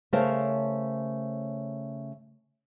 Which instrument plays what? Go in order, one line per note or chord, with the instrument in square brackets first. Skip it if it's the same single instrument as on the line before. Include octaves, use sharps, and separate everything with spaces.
[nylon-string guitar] C#3 A3 A#4 C5 C#5 F5